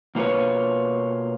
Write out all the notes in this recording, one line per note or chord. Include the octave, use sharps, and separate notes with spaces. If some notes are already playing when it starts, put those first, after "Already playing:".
B2 A#3 F4 F#4 B4 C#5